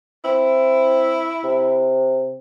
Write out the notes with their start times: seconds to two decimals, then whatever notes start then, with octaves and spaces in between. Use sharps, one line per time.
0.25 C4 E4
1.44 C3